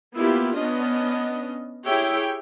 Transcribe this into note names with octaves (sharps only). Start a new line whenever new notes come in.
A#3 B3 E4 F4 G4
B3 C#4 D4 D#5
E4 G4 G#4 C#5 E5 G5